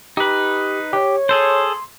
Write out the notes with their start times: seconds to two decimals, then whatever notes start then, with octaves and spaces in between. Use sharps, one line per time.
0.17 D#4 G4 B4
0.93 G4 C#5
1.29 G#4 A4 C5 C6